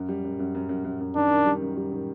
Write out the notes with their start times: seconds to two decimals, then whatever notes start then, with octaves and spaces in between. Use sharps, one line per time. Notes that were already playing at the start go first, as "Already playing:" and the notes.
Already playing: F#2
0.09 G3
0.24 F#2
0.39 F#2
0.55 F#2
0.69 F#2
0.84 F#2
1.00 F#2
1.16 D#3 D4
1.31 D#3
1.46 G3
1.62 F#2
1.77 G3
1.91 D#3